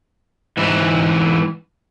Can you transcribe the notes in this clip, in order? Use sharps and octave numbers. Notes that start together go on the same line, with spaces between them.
G#2 E3